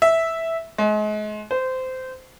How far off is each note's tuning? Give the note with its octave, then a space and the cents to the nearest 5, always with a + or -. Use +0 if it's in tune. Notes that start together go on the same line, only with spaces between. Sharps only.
E5 -5
G#3 +35
C5 -20